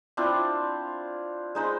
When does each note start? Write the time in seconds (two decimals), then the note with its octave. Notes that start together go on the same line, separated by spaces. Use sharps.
0.17 C4 D4 E4 F4
1.55 G#3 D#4 C5 B5